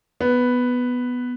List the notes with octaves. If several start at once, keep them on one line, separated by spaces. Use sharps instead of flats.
B3